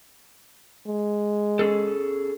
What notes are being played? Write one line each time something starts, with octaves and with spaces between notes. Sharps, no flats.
G#3
C#4 G#4 A4